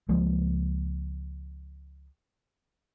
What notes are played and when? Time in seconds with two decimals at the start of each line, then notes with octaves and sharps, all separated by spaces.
0.09 C#2 F3 G#3 A#3